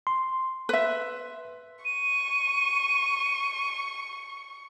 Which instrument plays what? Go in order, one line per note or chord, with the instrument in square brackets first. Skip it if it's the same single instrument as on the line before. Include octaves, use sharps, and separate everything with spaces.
[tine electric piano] C6
[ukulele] B4 E5
[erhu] C#6 [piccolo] D#7